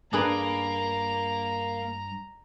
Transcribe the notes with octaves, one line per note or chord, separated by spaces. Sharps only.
G2 A#3 D4 G#4 B4 A#5 B5